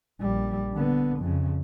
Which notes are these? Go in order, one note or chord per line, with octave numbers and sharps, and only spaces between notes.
A#1 G3
D3 B3
F2 C#3